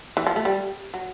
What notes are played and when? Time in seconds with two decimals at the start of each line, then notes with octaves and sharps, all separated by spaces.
0.17 E3
0.27 F3
0.36 A3
0.45 G3
0.94 F#3